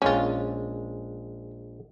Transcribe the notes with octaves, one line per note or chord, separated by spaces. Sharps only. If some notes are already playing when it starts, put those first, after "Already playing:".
A#1 G#3 C#4 F4 G5